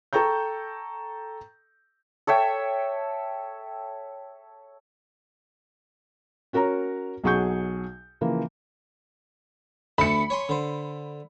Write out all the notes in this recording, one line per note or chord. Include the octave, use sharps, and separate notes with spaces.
A4 G5 A#5 C#6 G6
A4 C#5 E5 G5
C#4 F#4 A#4 C#5 A#5
B1 F#3 G#4 F#5 C#6 G6
C#3 E3 F3 A#3
D2 A3 A5 B5 C#7
C#5 G#5 C6
D3 C5